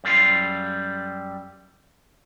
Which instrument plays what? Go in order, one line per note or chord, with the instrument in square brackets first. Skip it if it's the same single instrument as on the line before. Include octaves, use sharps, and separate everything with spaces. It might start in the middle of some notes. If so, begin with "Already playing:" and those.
[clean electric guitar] F#2 G3 A4 F5 C6